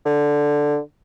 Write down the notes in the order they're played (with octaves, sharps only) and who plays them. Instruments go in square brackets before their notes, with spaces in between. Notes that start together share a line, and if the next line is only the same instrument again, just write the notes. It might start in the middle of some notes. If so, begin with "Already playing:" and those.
[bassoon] D3